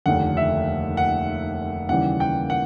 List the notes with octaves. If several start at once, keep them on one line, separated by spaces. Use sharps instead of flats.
F1 D#2 D3 F#5
E5
F#5
D#2 C#3 E3 G3 F#5
G5
F#5